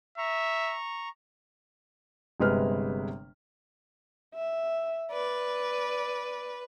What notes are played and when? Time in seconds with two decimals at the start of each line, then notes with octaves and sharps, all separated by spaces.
0.18 E5 A#5 C#6
2.40 G1 C3 G#3 B4 F6
4.35 E5
5.12 B4 D5